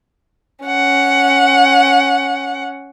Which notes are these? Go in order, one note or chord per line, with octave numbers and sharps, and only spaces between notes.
C#4 F#5